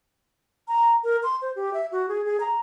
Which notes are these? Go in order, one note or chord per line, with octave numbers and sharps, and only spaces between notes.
A#5
A#4
C6
C5
G4
E5
F#4
G#4
G#4
A#5